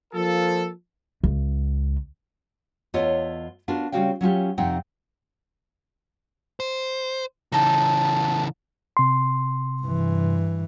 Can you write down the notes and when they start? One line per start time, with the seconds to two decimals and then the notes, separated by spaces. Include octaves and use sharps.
0.13 F3 A#3 F4 A4
1.24 C#2
2.94 E2 B3 F4 A4 C#5 D#5
3.68 B3 D4 F4 F#4 A#4
3.92 C#3 G3 C4 F#4 F5 G5
4.21 F#3 C#4 F4 G4
4.58 F2 C3 C4 D#4 F#5 G5
6.60 C5
7.52 C#3 E3 D#4 A4
8.97 C3 C6
9.83 G2 E3